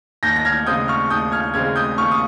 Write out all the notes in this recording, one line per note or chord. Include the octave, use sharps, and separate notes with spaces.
D#2 G6 A#6
A#6
F6 G#6
C#3 G#3 C4 D#6 G6
C#6 F6
D#2 D#6 G6
F6 G#6
C#3 G#3 C4 F6 G#6
D#6 G6
D#2 C#6 F6
D#6